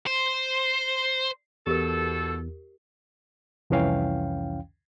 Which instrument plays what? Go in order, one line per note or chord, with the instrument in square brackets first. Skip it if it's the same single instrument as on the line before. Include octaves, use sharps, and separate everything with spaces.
[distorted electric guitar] C5
[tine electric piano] E2 [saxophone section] B2 A4 [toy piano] G4 A#4
[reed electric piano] C2 F2 E3 C#4 F5 G5